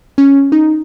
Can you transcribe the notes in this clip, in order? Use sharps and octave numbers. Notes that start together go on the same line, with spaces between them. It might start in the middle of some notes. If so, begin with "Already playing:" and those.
C#4
D#4